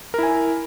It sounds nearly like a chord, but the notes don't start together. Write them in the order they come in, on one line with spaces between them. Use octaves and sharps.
A#4 E4 G#5